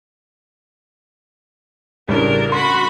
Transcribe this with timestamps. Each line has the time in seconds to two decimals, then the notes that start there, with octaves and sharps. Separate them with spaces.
2.08 A1 C#3 G3 D4 A#4
2.52 F#4 B5 C6